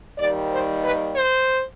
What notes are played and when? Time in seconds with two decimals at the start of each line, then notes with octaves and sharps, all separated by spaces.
0.18 D#2 D#3 G3 D5
0.50 C5
0.83 B4
1.15 C5